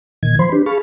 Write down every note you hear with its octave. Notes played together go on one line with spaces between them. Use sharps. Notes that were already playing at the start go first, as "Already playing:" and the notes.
A#2 D#3 G#6
F3 C5 B5 C6
D4 G4 B4
G#4 F5 A5 B5 C#6